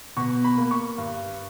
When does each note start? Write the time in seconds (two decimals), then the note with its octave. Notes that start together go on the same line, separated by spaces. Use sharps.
0.17 B2 C#6
0.44 B5
0.58 A#3
0.71 C#6
0.98 G2